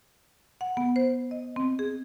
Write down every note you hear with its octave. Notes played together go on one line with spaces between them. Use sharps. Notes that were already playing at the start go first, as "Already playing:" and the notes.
F#5
B3
C5
D#5
C4
G#4